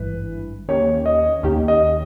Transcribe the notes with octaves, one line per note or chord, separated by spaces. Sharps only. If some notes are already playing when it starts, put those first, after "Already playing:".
Already playing: G#1 G2 E3 B4
D#2 D#3 A#3 C#4 G4 C#5
D#5
D#2 D#3 A#3 C#4 G4
D#5